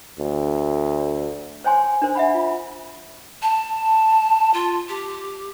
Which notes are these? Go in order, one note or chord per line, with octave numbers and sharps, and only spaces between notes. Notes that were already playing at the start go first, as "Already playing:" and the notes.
D2
C5 C#5 G5 G#5 C6
D4 A#4 C5
E5 F#5 B5
F4 B5
A5
F4
G4